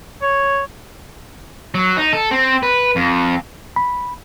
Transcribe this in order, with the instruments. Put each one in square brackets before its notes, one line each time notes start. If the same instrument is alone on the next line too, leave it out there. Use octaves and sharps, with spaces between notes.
[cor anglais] C#5
[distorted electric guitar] F#3
D#4
A4
C4
B4
F2
[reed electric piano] B5